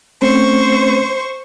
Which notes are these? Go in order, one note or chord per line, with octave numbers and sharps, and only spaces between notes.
A3 C4 C#4 C5 C#6